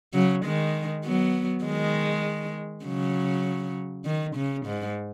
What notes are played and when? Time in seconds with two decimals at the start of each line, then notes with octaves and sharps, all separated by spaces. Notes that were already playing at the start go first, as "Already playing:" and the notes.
0.14 C#3 F#3
0.45 D#3 G#3
1.04 F#3 B3
1.64 D#3 G#3
2.85 C#3 F#3
4.05 D#3
4.36 C#3
4.66 G#2